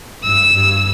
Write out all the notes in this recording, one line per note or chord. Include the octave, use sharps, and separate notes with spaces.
G2 E6
G2